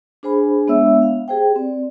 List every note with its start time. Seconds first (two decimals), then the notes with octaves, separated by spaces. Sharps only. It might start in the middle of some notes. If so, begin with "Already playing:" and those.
0.23 D4 G#4 C5 G#5 B5
0.67 G#3 B3 D4 C#5 E5 E6
1.02 F5
1.28 G4 G#4 C5 G5
1.56 C4 D5